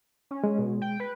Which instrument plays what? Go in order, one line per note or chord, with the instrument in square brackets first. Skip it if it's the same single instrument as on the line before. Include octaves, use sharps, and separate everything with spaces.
[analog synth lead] C#4
[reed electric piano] G#3
[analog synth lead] B2
G5
B4